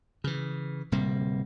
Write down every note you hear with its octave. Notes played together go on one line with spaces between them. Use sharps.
C#3 E3
D1 C3 G3 A#3